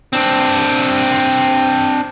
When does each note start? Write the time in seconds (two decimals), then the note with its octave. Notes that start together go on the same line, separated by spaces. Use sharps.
0.13 C4 D4